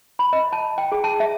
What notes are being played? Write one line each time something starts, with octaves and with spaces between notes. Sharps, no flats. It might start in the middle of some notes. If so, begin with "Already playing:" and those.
B5
D#5
A5
G5
G#4
A5
E5